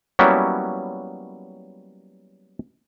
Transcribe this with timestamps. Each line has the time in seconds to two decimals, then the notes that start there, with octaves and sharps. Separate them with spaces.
0.19 F#3 G3 A#3 B3 C#4 E4